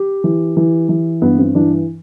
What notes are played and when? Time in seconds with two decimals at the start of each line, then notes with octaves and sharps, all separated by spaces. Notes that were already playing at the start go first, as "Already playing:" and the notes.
Already playing: G4
0.24 E3
0.57 E3
0.89 E3
1.22 G2 B3
1.39 C4
1.55 E3 D4